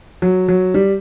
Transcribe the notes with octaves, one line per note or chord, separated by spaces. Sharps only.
F#3
F#3
G3